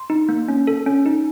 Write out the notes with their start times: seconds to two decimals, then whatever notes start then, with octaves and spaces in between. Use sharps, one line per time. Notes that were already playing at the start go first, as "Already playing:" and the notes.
Already playing: C6
0.10 D#4
0.29 A#3
0.48 C#4
0.67 A4
0.86 C#4
1.06 D#4